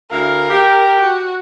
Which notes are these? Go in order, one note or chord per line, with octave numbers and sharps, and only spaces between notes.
D2 E4 A#4 F5
G4
F#4